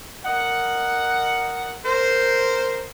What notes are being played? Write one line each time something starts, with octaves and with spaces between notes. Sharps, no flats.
A#4 D#5 F#5
A#4 C5